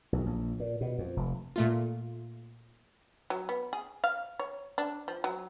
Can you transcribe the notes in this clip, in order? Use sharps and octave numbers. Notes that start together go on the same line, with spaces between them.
B1
A#1
A#2
B2
F2
F1
A#2 A3 F4
F#3
B3
G#4
F5
C#5
D4
F3
F#3